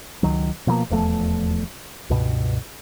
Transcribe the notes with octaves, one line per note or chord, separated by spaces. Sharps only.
C#2 D#3 F#3
B2 F3 F#3 A#3
D#1 E2 F3 A3
C#2 G2 B2